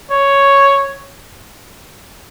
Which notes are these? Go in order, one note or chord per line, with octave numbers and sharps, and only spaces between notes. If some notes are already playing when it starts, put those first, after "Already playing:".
C#5